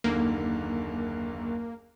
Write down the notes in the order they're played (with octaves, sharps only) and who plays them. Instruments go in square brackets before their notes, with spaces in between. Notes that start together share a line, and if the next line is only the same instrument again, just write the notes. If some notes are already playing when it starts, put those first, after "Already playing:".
[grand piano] F#1 D#2 D3 [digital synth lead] A#3